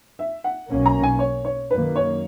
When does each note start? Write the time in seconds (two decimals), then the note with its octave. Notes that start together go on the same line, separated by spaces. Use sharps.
0.19 E5
0.44 F#5
0.70 B1 B2 A#3 C#4
0.86 A#5
1.03 G#5
1.19 C#5
1.45 C#5
1.71 F#2 D#3 A#3 B4
1.96 C#5